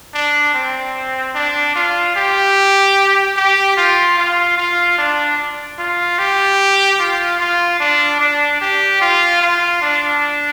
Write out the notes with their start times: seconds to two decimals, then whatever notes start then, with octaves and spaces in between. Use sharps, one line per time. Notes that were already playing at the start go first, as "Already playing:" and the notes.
0.15 D4
0.55 C4
1.35 D4
1.76 F4
2.16 G4
3.37 G4
3.77 F4
4.18 F4
4.58 F4
4.98 D4
5.79 F4
6.19 G4
6.99 F4
7.40 F4
7.80 D4
8.21 D4
8.61 G4
9.02 F4
9.42 F4
9.82 D4